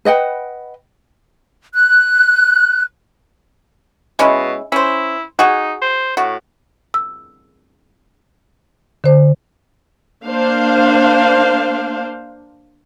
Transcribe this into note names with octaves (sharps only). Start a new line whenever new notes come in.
B4 D#5 F#5 G5
F#6
B2 G#3 C#4 E4
C#4 E4 C5
D#4 F#4 G#4
C5
A2 F#4
E6
D3 C5
A#3 D4 C5 F5